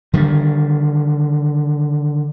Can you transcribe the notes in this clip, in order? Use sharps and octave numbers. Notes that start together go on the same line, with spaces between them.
D3 D#3 G3